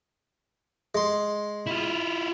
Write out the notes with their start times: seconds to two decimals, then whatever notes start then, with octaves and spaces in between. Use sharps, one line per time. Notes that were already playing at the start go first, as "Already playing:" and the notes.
0.95 G#3 C6
1.66 E4 F4